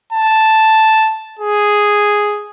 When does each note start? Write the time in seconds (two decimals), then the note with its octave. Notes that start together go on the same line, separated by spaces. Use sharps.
0.13 A5
1.39 G#4